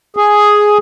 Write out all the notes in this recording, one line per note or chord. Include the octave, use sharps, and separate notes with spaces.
G#4